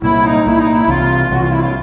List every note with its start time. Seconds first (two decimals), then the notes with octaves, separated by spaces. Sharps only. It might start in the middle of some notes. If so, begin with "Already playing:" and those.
0.02 C2 A#2 G3 A#3 E4
0.24 D#4
0.45 C2 A#2 G3 A#3 E4
0.58 D#4
0.71 E4
0.88 C2 C3 E3 F4
1.31 C2 C3 E3 F#4
1.40 F4
1.50 E4
1.60 F4